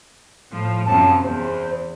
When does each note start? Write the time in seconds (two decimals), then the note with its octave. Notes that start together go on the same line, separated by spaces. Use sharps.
0.52 A2 F3
0.86 F#2 C3 F3 A5
1.24 E2 C5